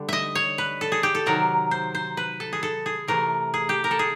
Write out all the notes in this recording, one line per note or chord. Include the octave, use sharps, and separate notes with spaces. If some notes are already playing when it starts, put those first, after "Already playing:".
Already playing: D3 G3
D#5 E5
C#5
B4
A4
G#4
G4
A4
C3 D#3 F#3 A#4
C5
C5
B4
A4
G#4
A4
G#4
C3 E3 A3 A#4
G#4
G4
A#4
A4
G#4